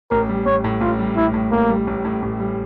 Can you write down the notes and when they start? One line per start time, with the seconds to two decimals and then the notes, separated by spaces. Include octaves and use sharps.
0.11 A1 A#4
0.29 G3
0.46 A1 C#5
0.64 A2
0.81 A1 F4
0.99 G3
1.16 A1 E4
1.34 A2
1.51 A1 A#3
1.69 G3
1.87 A1
2.05 A2
2.22 A1
2.40 G3